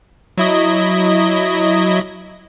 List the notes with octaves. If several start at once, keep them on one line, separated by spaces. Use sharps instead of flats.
F#3 E4 D#5